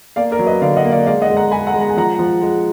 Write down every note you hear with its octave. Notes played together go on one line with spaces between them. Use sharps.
A#3 D5 F5
A#4 D5
F#3
B4 D#5
D3 D5 F5
D#5 F#5
A#3
D5 F5
G#3 D5 F5
D#5 F#5
G#3
F#5 A#5
G#3 G#5 B5
F#5 A#5
G#3
A#5
G#5
F3 F#5 A#5
F3
G#3